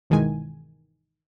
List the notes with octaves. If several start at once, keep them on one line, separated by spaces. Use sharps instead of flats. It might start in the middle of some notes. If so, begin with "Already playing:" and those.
G1 B2 D#3 E3 G#3 G#5